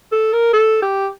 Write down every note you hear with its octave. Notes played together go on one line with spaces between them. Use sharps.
A4
A#4
A4
G4